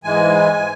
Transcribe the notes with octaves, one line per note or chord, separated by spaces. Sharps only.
G#2 E3 G#3 G#5